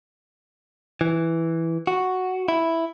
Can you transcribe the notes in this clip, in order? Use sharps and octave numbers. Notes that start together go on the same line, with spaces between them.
E3
F#4
E4